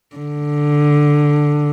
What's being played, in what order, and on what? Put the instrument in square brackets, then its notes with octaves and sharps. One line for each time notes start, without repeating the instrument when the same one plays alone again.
[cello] D3